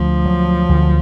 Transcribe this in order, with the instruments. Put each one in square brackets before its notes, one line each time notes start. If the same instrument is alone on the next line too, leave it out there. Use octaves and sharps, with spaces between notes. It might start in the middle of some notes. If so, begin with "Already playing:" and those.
Already playing: [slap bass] D2 [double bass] F3
[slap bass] F#3
D2